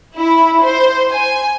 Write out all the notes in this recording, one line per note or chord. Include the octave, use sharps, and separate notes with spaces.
E4
C5
G#5